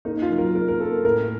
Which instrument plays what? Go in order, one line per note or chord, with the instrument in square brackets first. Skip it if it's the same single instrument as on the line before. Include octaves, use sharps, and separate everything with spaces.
[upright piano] A#3 D#4
F4
F#3
A#4
A#3 A#4
A#4
A#3 A4
A2 A#4